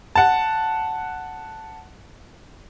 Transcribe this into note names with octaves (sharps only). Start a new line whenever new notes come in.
F#5 A5